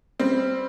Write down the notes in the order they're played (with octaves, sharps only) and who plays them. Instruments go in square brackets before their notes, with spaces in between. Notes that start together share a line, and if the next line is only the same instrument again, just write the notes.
[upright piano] G3 C4